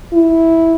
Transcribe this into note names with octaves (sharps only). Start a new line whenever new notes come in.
E4